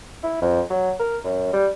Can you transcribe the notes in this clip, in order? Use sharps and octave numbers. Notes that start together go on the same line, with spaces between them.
E4
F2
F#3
A#4
F#2
G3